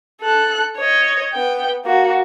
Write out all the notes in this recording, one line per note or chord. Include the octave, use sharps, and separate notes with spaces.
A4 F#6
C#5 D#5
B3 G5
A#3 F#4